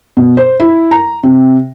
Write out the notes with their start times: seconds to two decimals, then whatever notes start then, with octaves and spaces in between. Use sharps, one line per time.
0.17 B2
0.37 C5
0.60 E4
0.91 A#5
1.23 C3